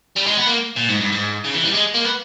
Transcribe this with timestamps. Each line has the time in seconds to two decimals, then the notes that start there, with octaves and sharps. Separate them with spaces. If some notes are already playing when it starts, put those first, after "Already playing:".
0.17 G3
0.27 G#3
0.38 B3
0.47 A#3
0.76 A#2
0.89 G#2
1.01 G2
1.12 G#2
1.45 C#3
1.55 E3
1.65 G3
1.75 G#3
1.95 A#3
2.05 B3